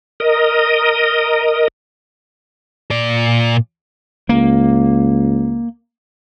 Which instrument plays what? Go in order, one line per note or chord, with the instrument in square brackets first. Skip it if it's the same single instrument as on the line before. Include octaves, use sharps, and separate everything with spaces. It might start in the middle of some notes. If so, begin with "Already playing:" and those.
[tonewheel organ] A#4 D#5
[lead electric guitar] A#2 D5
[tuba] C#2 [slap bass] A#3